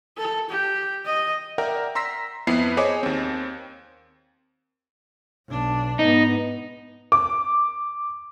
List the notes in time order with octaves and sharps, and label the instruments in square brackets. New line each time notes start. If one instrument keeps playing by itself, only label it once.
[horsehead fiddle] A4
G4
D#5
[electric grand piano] A#4 D5 E5 F#5 G5 A#5
A#5 C6 E6 A#6 B6
F2 B3 E4 B4 C7
G#4 C5 C#5 D#5 G#5 D6
D#2 C4
[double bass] B1 D4
[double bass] G#2 B3 [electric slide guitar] D#4
[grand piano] D6